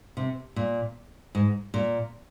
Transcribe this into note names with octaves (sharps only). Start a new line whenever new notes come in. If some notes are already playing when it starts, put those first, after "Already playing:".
C3
A#2
G#2
A#2